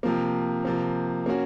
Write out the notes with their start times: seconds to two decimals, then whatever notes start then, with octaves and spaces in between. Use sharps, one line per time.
0.03 C3 F3 A#3
0.65 C3 F3 A#3
1.26 A#3 C#4 F#4